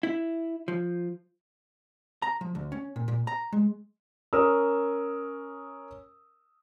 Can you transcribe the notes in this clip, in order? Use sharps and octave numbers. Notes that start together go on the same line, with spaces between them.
E4
F3
A#5
F3
D2
C#4
A#2
A#2
A#5
G#3
C#4 A#4 D#6 E6